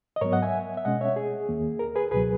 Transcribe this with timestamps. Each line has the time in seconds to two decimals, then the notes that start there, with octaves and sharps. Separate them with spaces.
0.16 D#5
0.21 G#2 F#3 B3 A#4 C#5
0.32 D#5 F#5
0.42 E5 G#5
0.77 E5
0.85 B2 G#3 C#4 D#5 F#5
1.01 C#5 E5
1.16 G#4
1.49 D#2 D#3 A#3
1.79 A#4
1.96 G#4 B4
2.11 C#2 B2 F#3 G#4 B4